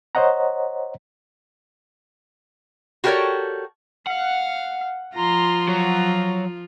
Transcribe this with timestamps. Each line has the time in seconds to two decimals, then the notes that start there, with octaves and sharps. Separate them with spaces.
0.15 C5 C#5 D#5 F#5 A#5
3.04 F#4 G4 A4 A#4 C#5 D5
4.07 F5 F#5
5.15 F3 F4 A#5 C6
5.69 F#3 A#5